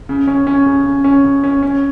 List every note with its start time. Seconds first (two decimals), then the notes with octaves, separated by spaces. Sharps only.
0.09 C#3
0.27 C#4
0.47 C#4
0.66 C#3
0.86 C#3
1.04 C#4
1.24 C#3
1.44 C#4
1.63 C#4